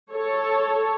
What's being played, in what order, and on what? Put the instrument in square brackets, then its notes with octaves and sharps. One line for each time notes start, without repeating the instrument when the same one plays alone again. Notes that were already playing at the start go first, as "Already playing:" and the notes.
[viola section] A4 C#5